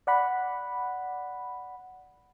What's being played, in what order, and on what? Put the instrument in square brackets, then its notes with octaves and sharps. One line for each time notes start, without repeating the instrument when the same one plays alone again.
[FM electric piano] D5 F#5 B5